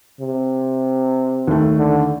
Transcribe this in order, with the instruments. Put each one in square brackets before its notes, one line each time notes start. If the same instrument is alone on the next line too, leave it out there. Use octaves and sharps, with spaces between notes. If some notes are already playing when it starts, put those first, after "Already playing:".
[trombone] C3
[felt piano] D#2 A3
[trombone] D3